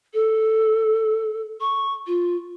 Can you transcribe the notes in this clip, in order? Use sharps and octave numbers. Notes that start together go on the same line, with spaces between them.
A4
C#6
F4